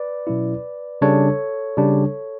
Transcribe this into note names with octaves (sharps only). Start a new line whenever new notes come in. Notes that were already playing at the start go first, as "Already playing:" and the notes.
Already playing: B4 D5
B2 F#3 C#4 E4
C#3 G3 D4 A4 C#5
C#3 G3 D4